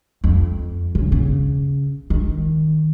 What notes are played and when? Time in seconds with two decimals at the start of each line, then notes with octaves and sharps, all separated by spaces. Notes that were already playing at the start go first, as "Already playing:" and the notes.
0.24 F2
0.95 C#3
1.12 C#3
2.10 D#3